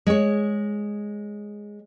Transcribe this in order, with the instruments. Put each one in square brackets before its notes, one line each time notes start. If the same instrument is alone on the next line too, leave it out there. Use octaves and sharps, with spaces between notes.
[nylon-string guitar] G#3 C#5